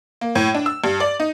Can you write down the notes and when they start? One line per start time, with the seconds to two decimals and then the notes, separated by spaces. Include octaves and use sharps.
0.21 A#3
0.35 A2
0.55 D4
0.66 E6
0.84 G2
1.00 D5
1.20 D#4